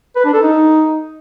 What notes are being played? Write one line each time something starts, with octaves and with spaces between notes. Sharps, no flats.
B4
D4
A4
D#4